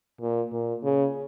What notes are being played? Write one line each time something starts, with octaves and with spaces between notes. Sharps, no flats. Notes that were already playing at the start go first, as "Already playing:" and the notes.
A#2
A#2
C#3